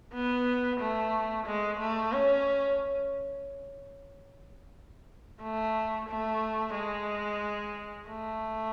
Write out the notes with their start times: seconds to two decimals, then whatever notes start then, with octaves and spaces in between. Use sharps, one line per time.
0.14 B3
0.80 A3
1.46 G#3
1.79 A3
2.12 C#4
5.43 A3
6.08 A3
6.75 G#3
8.08 A3